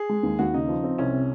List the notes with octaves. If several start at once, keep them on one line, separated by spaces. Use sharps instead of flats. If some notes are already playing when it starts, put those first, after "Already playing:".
Already playing: G#4
G#3
D#2
D#2 F#4
C#3 D#4
F3
C4
C2 C#4
C3